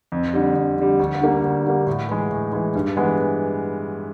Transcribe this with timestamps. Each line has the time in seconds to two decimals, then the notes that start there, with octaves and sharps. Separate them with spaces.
0.12 F2
0.33 D3 G3
0.55 F2
0.78 D3 G3
0.99 D2
1.21 D3 G3 A#3
1.44 D2
1.66 D3 G3 A#3
1.87 A2
2.09 E3 G#3
2.31 A2
2.53 E3 G#3
2.75 G2
2.97 E3 G#3 B3